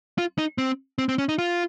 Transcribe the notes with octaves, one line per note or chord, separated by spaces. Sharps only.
F4
D#4
C4
C4
C4
C#4
D#4
F4